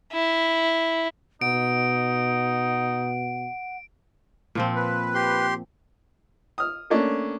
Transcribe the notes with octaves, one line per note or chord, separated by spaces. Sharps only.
E4
B2 D#4 F#5 D7
A#2 F3 C4
B4
G4 C6
D#6 F6
A3 A#3 C#4 D4